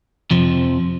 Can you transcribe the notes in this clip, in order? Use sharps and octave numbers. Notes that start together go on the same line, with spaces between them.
F2 C3 F3